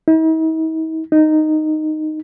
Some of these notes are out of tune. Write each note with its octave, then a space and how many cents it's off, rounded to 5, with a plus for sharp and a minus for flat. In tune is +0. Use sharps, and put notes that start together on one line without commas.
D#4 +45
D#4 -10